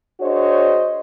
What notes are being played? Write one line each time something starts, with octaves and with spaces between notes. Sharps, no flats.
D4 F#4 G#4 C5 C#5 D#5